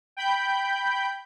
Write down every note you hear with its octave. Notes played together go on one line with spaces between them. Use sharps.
G5 B5 G6